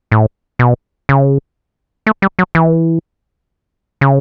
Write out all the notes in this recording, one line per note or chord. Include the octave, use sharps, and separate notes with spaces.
A2
B2
C#3
A3
G3
F#3
E3
C#3